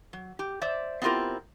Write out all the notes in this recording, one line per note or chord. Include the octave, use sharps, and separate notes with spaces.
F#3
G4
C5 D5 E5
B3 C4 E4 F4 G4 A#4